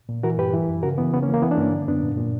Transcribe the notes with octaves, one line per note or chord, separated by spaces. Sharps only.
A#2
E3 F#4 A#4
G2 G4 B4
E3
F#2
C#3 F#4 A#4
E3 B3
C#3 B3
A#3 C#4
E3
A#3
E3 B3
D4
G2 A#3 C#4
D3
F#2 B3 D4
A#2
A#2